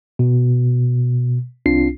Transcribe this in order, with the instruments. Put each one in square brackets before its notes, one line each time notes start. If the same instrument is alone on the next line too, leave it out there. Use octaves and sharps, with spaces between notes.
[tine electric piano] B2
C2 C4 D4 F4 C7